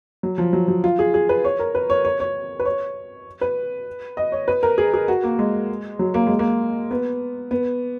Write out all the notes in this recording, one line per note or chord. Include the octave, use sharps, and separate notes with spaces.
F#3
F3
F#3
F#3
F4
G#4
G#4
B4
C#5
A#4
B4
C#5
C#5
C#5
B4
C#5
B4
D#5
C#5
B4
A#4
G#4
G#4
F#4
A#3
G#3
F#3
A#3
G#3
A#3
B3
B3